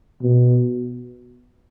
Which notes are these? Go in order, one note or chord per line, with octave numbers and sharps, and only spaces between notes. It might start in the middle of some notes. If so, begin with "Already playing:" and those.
B2